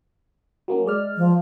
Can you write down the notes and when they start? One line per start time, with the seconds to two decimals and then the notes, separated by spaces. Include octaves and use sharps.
0.68 F#3 A#3 C#4
0.86 G#3 D5 F6
1.17 F3